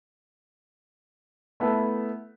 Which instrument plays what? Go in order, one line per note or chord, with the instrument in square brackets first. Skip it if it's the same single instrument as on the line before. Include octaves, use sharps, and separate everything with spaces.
[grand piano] A3 B3 E4 A4